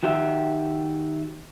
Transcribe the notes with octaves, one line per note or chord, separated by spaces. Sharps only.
D#3 F#4 G4 E5